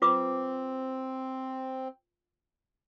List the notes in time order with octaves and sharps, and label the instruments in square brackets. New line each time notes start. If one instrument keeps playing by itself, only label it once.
[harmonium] C4 [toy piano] F4 B4 D6